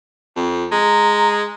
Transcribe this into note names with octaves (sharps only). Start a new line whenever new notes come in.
F2
G#3 A#5